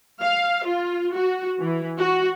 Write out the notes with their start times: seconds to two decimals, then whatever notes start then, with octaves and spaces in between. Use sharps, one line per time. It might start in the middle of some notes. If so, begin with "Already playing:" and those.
0.21 F5
0.65 F4
1.14 F#4
1.60 E3
1.97 F#4